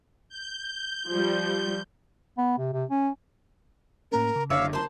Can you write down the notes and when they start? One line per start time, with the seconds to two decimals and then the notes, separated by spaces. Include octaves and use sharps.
0.29 G6
1.08 F3 G3
2.38 B3
2.59 C3
2.73 C3
2.90 C#4
4.12 A2 A#3 C#4 A#4
4.36 C#3
4.50 F#1 D3 C#5 D5 E5 F5
4.73 A#4 C5 A5 C6